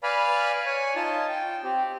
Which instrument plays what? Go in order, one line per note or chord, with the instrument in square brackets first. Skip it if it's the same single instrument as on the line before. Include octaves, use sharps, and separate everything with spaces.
[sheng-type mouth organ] B4 D5 F5 G#5 B5 F6
C#5 G#5
D#4 F4 A5
G5
C4 G4